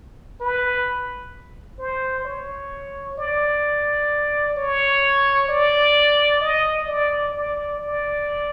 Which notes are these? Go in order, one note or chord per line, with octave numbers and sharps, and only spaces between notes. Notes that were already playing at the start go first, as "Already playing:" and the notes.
B4
C5
C#5
D5
C#5
D5
D#5
D5
D5
D5